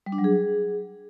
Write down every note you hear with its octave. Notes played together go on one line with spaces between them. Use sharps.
G3
D4
F#3
G#4